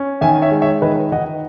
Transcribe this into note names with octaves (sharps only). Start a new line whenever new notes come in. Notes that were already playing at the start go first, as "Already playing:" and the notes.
Already playing: C#4
D#3 E5 G#5
C#5 E5
G#3
C#5 E5
D#3 B4 D#5
D#3 D#5 F#5